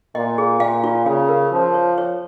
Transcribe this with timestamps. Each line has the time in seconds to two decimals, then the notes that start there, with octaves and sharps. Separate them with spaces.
0.15 A#2 D#5
0.38 G#4
0.60 A#2 F5
0.84 F4
1.06 C#3 F5
1.29 A#4
1.52 F3 F4
1.74 C#5
1.98 C#5